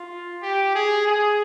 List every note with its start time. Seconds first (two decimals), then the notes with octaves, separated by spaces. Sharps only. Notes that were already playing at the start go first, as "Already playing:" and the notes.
Already playing: F4
0.42 G4
0.75 G#4
1.07 G#4